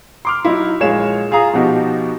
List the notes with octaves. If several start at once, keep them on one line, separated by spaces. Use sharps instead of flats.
C6 D6 F6
F#3 D#4 E4
A#1 G#3 C#5 F5 E7
F4 G#4 F5 A#5 D#6
B2 F3 D#4 F#4 G4